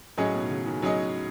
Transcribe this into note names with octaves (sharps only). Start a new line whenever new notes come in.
A2 F#3 C#4 G#4 D#5
B2
D#3
C#3
D#3
D#3 F#3 C#4 G#4 D#5